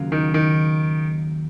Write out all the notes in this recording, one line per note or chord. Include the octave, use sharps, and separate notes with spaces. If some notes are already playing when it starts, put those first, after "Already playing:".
Already playing: D#2 C#3 F#3 A#3 F4
D#3
D#3